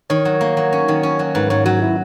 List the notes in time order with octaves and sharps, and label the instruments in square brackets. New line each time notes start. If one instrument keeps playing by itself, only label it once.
[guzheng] D#3 [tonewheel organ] C#5
[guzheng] F#3
A#3
F#3
C#4
D#3
C#4
F#3
[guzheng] G#2 [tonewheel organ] B4
[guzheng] G#2 [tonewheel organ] C#5
[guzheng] F#3 [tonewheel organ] F#4
[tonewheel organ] E4